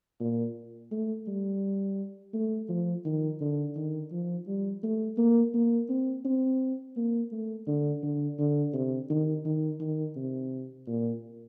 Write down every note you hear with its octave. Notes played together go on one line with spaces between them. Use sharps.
A#2
A3
G3
A3
F3
D#3
D3
D#3
F3
G3
A3
A#3
A#3
C4
C4
A#3
A3
D3
D3
D3
C3
D#3
D#3
D#3
C3
A#2